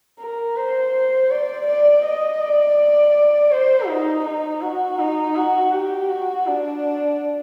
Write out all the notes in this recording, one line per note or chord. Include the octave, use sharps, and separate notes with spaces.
A#4
C5
D5
D5
D#5
D5
C5
D#4
D#4
F#4
D#4
F#4
G4
F#4
D4